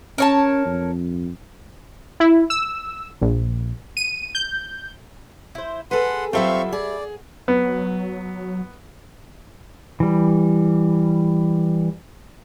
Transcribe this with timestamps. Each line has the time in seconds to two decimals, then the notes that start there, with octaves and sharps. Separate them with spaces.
0.18 C#4 A#4 C#5 A5
0.66 F2
2.20 E4
2.50 E6
3.21 A#1
3.97 D#7
4.35 G6
5.55 E4 C5
5.91 G#4 A4 B4 F#5 C6
6.33 F#3 G3 C4 F4 A4 E5 F5 C#6
6.72 G#4 D5
7.48 F#3 B3
10.00 E3 G3